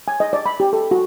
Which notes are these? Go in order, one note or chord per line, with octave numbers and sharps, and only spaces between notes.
G#5
D#5
D5
B5
G4
A4
F#4